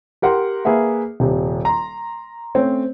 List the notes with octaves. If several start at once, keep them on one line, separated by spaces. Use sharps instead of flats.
G4 A#4 F#5 C6
A#3 G#4 B4 E5 F#5
D#1 C3
A#5 C6
A3 C4 C#4 C#5